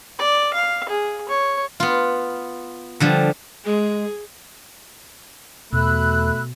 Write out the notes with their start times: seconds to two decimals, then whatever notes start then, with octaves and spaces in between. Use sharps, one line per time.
0.19 D5
0.54 F5
0.89 G#4
1.29 C#5
1.80 B3 F4
3.00 D3 F3 G3
3.65 G#3 G#4
5.73 E2 B2 A3 B5 E6 F#6